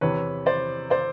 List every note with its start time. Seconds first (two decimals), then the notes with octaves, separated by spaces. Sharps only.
0.01 E2 C3 E3 B4 C#5
0.46 C5 D5
0.90 C5 D5